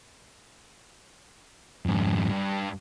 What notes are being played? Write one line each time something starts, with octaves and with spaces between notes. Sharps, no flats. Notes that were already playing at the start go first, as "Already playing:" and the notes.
F2 G#2
G2